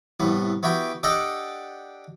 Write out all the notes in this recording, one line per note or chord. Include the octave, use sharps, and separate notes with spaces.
C2 A2 B3
B3 E4 F#4 G4 G5
D4 G4 A4 D#5 F#5 G5